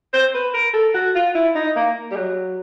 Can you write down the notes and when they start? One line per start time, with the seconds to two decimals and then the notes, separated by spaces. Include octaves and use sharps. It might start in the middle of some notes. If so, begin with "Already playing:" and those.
0.14 C5
0.34 B4
0.54 A#4
0.74 A4
0.94 F#4
1.15 F4
1.35 E4
1.55 D#4
1.76 A#3
2.11 G3
2.16 F#3